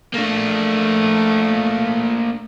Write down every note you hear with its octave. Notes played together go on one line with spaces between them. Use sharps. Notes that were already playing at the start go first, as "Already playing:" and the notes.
A3 A#3 D4